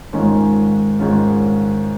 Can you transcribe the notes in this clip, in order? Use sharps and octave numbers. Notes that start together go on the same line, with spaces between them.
G#2 D#3 G#3 C#4 F4
G#2 D#3 G#3 C#4 F4